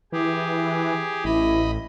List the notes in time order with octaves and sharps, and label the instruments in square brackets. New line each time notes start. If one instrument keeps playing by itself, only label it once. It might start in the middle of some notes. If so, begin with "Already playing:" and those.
[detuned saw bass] E3 [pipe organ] G4 G#4
[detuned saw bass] A1 [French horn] E4 [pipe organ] D#5 B5